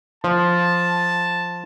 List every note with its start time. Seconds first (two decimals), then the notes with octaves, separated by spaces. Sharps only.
0.24 F3 A5